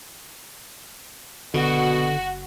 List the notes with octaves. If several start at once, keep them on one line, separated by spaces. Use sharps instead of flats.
F#1 B2 D3 F#4